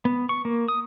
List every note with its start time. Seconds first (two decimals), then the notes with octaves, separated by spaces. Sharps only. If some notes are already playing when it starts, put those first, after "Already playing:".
0.05 B3
0.29 C#6
0.45 A#3
0.68 D#6